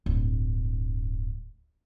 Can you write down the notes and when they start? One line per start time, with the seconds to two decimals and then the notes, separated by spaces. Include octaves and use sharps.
0.06 D1 G2